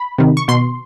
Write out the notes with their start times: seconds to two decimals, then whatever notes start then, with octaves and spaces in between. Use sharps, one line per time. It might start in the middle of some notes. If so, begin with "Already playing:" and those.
Already playing: B5
0.18 C3 D#3
0.37 C#6
0.48 B2 C6